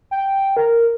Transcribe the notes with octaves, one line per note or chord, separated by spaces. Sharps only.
G5
A#4